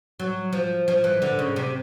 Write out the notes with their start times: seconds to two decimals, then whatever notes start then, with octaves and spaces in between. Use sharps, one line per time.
0.20 F#3
0.53 F3
0.88 F3
1.04 E3
1.22 D3
1.39 C#3
1.56 C3